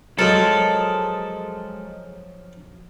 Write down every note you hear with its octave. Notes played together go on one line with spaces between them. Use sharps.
F3 F#3 G#3 A4 A#4